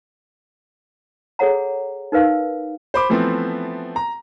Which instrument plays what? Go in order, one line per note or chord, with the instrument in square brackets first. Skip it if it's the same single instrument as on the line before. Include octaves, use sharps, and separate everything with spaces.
[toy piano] G#4 A4 C#5 F#5 A#5
D#4 A#4 B4 F5
[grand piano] C5 B5 D6
E3 F3 A3 B3 C4
A#5